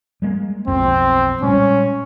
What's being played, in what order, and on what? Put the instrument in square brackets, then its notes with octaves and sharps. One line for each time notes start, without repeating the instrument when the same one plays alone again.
[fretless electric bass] G3 G#3 A#3
[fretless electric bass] B1 F2 [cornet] C4
[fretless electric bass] A#2 G3 G#3 [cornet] C#4